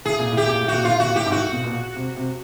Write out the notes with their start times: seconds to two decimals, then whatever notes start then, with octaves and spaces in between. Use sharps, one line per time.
0.05 A2 G#4
0.19 A#2
0.32 A2
0.37 G4
0.46 A#2
0.60 A2
0.68 F#4
0.74 A#2
0.84 A2 F4
1.00 A#2 F#4
1.15 A2 G4
1.26 G#2
1.32 A2 F#4
1.52 B2
1.64 A#2
1.96 C3
2.17 C3